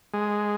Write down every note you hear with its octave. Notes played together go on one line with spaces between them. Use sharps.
G#3